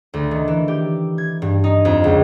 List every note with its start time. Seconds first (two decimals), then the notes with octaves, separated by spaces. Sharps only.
0.14 D2
0.31 D#3
0.48 E3
0.68 G4
1.18 G#6
1.42 G2
1.64 D#4
1.85 F2
2.04 C#2